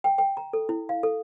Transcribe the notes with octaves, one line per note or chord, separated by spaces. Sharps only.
G5
G5
A#5
A4
E4
F5
A4